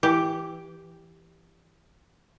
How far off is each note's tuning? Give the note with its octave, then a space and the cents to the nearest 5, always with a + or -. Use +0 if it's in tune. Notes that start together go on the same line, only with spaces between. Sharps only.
E3 +0 G4 +0